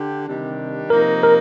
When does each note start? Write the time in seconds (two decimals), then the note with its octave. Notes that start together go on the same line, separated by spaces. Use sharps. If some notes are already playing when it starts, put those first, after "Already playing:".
Already playing: D3 G4
0.26 C3 D#3 G3 D4
0.90 C3 F3 A#3 D#4 A#4
1.23 A#4